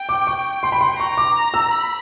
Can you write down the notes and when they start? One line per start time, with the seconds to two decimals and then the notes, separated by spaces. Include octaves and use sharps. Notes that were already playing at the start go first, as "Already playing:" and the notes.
Already playing: G5
0.09 D6
0.27 C#6
0.63 C6
0.72 B5
0.81 C6
1.00 A#5 C#6
1.17 D6
1.54 E6
1.71 B5